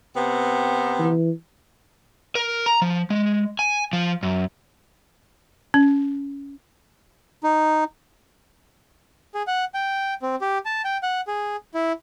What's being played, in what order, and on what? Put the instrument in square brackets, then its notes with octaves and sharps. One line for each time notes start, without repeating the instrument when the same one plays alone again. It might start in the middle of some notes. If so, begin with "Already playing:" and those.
[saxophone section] C3 B3 C4
[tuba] E3
[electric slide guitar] A#4
A#5
F3
G#3
G#5
F3
F#2
[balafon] C#4
[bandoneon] D#4
[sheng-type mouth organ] G#4
F#5
G5
C4
G4
A5
G5
F#5
G#4
E4